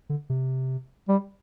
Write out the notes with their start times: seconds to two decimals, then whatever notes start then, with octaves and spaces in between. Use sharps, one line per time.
0.09 D3
0.30 C3
1.08 G3